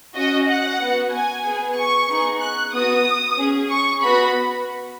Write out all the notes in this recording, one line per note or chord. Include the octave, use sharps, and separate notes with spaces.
C#4 F#4 D#5
F#5
B3 F#4
G#5
B3 G#4
C#6
B3 D#4 G#4
F#6
B3 F#4 D#6
C#4 G#4
C#6
B3 F#4 B5